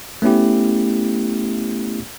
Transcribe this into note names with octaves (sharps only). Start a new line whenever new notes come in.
A3 B3 C#4 E4 G4